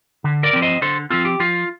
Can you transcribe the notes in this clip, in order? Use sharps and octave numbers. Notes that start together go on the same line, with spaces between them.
D3
A#4 D5
F3 C4
C5 D#5
D3 A4 C5
F3 C4 F4 A4
G4
F3 F4